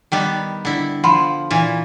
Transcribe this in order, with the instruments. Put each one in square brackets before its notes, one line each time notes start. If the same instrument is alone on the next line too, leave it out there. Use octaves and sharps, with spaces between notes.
[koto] D#3 G3 B3
D3 E4
[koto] F3 [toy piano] F#5 B5 C6
[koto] A#2 E3